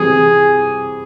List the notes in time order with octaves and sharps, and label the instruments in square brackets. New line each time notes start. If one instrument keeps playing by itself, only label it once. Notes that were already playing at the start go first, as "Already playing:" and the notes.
Already playing: [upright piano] C3 E3 G3 [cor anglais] G#4